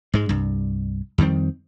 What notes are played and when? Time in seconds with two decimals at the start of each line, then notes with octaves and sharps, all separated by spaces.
0.14 G#2 G#3
0.29 C2 G2
1.18 F2 D#3 G3 C4